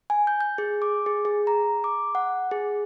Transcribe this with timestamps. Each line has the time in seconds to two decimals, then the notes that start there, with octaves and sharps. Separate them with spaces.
0.10 G#5
0.27 G6
0.41 G6
0.58 G#4
0.82 D6
1.06 G#4
1.25 G#4
1.47 A#5
1.84 D6
2.15 F#5
2.51 G#4